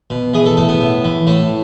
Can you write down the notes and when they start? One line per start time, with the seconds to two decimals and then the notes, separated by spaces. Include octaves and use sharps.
0.10 B2
0.34 E3 G#4
0.46 A4
0.57 A2 A4
0.69 B3
0.80 A2
1.04 E3
1.27 A2 A3